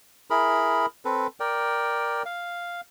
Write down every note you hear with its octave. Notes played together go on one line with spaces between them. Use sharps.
E4 G#4 A#4 B5
C4 A4 B4
A#4 D5 G5
F5